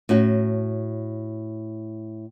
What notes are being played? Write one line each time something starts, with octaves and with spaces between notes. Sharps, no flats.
A2 C#4 F#4